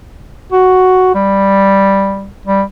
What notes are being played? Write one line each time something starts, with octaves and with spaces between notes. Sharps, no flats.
F#4
G3
G3